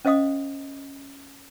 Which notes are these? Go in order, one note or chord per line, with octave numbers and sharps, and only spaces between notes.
C#4 C5 D#5 F5 D#6